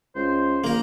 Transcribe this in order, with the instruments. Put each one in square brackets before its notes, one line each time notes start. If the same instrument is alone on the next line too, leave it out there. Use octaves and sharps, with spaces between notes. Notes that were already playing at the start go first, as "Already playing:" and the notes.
[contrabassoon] C#2 [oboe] C5
[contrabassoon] A#1 [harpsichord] A#3 A#4